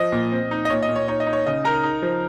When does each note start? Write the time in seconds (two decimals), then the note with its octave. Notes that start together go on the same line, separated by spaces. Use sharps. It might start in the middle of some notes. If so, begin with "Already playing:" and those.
Already playing: F3 D#5
0.12 A#2
0.32 C4
0.51 D#4
0.65 D#5
0.70 A#2 C#5
0.83 D#5
0.89 A#2
0.96 C#5
1.08 D#4 C#5
1.20 D#5
1.27 D#4
1.33 C#5
1.46 C#3 D#5
1.64 D#4 A#4 A#5
1.83 D#4
2.02 F3